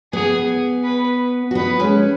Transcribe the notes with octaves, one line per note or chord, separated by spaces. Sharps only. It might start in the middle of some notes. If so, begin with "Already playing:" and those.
B3 G#4
B4
F#4
B3 D#4 B4
G#3 C#4